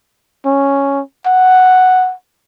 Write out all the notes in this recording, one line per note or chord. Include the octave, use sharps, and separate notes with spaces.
C#4
F#5